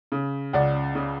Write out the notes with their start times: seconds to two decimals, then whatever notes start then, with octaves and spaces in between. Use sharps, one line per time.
0.12 C#3
0.53 C#2 D5 F#5
0.95 C#3